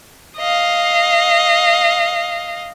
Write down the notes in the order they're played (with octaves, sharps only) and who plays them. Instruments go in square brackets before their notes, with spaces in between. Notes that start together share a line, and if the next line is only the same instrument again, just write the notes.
[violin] D#5 F5